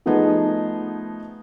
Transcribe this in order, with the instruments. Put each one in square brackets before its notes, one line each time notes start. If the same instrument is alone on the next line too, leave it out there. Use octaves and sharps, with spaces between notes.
[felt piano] F3 A3 B3 D#4 G#4